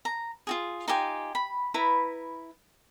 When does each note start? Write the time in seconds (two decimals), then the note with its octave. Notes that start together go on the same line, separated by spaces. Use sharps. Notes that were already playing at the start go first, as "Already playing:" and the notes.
0.05 A#5
0.47 F4 F#4 G#4
0.88 D#4 F4 G4 G#5
1.35 B5
1.74 E4 B4 A#5 B5